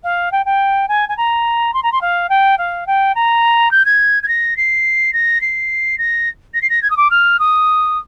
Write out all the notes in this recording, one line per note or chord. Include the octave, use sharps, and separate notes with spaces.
F5
G5
G5
G#5
G#5
A#5
C6
A#5
C6
F5
G5
F5
G5
A#5
G6
G#6
G#6
A#6
C7
A#6
C7
A#6
A#6
C7
A#6
G#6
D#6
D6
F6
D#6